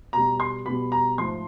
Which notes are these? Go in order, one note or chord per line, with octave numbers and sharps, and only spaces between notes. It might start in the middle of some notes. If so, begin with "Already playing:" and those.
B2 G3 A#5
C6
B2 G3 B5
A#5
G#2 F3 A3 C6